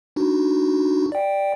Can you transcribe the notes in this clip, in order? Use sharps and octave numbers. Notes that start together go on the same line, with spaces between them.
D4 D#4 F#4
D5 G5